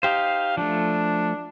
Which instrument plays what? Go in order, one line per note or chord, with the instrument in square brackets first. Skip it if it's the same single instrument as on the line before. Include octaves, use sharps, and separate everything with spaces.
[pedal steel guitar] D#4 G4 C5 [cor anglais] F5
[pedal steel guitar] F3 A3 [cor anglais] D4